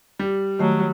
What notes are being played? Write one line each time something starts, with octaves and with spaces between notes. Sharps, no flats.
G3
D#3 F#3 A3